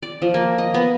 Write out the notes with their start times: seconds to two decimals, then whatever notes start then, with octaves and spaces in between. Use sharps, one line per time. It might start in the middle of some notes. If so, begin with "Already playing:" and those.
0.03 D5
0.22 F3
0.34 A#3
0.58 D#5
0.74 B3